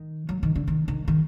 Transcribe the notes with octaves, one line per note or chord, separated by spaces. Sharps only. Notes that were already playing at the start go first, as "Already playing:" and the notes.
Already playing: D#3
F#3
D#3
D3
D#3
D#3
D#3